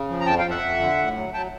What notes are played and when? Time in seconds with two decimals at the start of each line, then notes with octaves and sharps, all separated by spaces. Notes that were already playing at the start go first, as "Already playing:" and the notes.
Already playing: C#3
0.09 F3
0.21 A#5
0.26 F2 G5 A5
0.38 F5 G5
0.45 F2
0.50 E5 F#5
0.62 F2
0.80 D3
0.98 A2
1.16 F#3
1.34 F#3 G5 A5